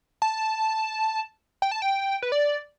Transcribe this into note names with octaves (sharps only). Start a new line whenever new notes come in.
A5
G5
A5
G5
B4
D5